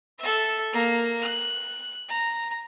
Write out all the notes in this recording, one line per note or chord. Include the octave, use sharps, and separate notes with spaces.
A4 E5
A#3
F#6
A#5